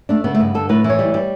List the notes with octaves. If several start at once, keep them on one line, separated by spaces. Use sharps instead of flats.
A3 D4
C#3 B3
A3
G2 B3
D3 A4
A2 B4
E3
C#5
G3
G3